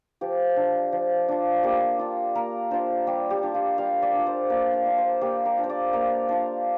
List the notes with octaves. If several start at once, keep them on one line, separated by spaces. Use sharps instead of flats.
F3 G4
D4 F4
F3
D4 F4
A#3 G4
D4 F4
A#3 A#4
D4 F4 C5
G3 G4
G4
D4 F4
F4
G3 F5
D5
D4 F4
C5
A#3 D5
F5
D4 F4
C5
A#3 G4
A#4
D4 F4
C5
D5
A#3 F5
D4 F4